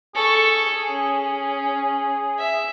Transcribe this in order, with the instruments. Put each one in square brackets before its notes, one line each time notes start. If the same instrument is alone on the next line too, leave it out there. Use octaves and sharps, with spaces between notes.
[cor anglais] G#4 [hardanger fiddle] A4 C#6
[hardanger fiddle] C#4
E5